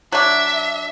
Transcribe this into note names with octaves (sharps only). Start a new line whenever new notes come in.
F#3 D4 E5